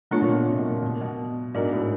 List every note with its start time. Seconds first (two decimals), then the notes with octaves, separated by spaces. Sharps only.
0.11 B2 A3 D4 F4 A4 C#5
0.22 A#2
0.29 B2
0.47 C3
0.58 B2
0.70 A#2
0.82 B2
1.01 B2
1.54 G#2 D4 F#4 A#4 D5
1.73 A2